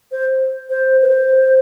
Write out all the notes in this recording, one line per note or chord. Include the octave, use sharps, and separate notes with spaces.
C5
C5
B4
C5